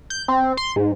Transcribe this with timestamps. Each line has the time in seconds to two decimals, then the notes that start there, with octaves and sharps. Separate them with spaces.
0.10 G6
0.28 C4
0.57 C6
0.76 G#2